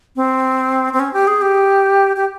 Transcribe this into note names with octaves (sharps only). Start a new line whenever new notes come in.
C4
C4
C#4
G4
G#4
G4
G4